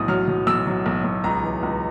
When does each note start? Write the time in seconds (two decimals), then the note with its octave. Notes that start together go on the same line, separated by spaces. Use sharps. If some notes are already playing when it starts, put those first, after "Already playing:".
Already playing: B1 A2 D#6
0.08 F#3 F6
0.28 F#3
0.47 B1 E6
0.67 F#3
0.86 B1
1.04 B1
1.24 C#2 A#5
1.43 E3
1.63 C#2